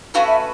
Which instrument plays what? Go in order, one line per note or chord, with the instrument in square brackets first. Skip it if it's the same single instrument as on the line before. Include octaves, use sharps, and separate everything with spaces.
[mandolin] A3 C#4 F#4 B4 [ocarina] F5
[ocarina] E5